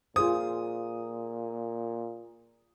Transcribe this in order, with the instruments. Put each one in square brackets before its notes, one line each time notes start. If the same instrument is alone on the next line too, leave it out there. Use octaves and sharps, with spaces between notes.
[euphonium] A#2 [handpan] F4 G#4 C5 [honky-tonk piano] D#6